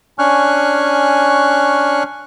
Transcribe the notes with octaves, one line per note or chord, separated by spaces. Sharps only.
C#4 D4 G#5 C#6 F6 F#6